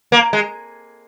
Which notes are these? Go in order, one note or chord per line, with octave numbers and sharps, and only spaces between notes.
A#3
G#3